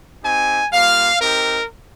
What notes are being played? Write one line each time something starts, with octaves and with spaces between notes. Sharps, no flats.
C4 D#4 G4 G#5
G3 A#3 F4 F5
C4 D#4 G4 A#4